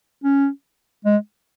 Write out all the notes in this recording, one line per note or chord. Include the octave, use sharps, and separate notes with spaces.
C#4
G#3